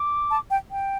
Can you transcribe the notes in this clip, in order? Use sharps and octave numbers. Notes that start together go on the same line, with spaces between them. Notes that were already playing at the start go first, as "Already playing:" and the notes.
Already playing: D6
A5
G5
G5